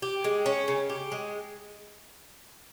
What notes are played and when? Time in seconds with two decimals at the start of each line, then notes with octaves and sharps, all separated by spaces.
0.02 G4
0.24 G#3
0.46 C#4
0.68 C#3
0.90 G4
1.12 G#3